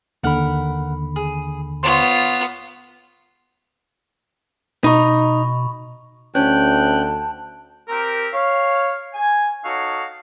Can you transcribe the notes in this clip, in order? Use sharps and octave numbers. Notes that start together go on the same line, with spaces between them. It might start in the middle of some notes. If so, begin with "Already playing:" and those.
D#2 D3 A#4 F#5 B5
G#4
B3 F4 C5 C#5
B2 D#4 B5 C#6
D2 C#4 G5 A5 F#6
C4 G4 A#4
C#5 F5
G#5
D#4 F#4 A4 C#5 F5